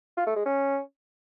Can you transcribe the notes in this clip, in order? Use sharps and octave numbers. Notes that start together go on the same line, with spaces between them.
F4
A3
G#3
C#4